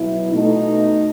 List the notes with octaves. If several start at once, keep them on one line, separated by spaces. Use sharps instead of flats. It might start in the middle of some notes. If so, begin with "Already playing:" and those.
Already playing: B2 F#3 B3 E4
B2 A3 D#4